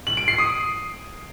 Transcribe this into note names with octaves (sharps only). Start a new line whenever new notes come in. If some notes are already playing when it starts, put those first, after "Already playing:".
F#7
D7
C7
D#6